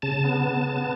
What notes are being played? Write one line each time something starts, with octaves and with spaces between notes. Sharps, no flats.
C#3 A5
B3
C#3
B3